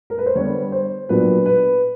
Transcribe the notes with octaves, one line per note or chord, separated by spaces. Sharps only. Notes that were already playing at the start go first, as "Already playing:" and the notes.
A#4
B4
C5
D3 G3 B3 D4 C#5
C5
A#2 F#3 B3 D4 B4
B4